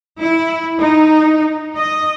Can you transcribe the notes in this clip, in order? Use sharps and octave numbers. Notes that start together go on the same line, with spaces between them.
E4
D#4
D#5